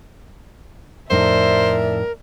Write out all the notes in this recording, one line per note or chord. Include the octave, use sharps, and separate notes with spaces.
F2 A2 D#4 A#4 C5 D5 E5